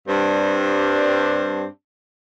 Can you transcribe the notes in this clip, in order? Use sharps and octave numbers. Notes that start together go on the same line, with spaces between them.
G2 G3 C4 D4